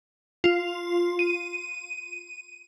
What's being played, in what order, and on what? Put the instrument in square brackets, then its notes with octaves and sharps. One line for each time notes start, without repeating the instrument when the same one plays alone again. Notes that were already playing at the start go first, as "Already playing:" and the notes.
[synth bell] F4
D#7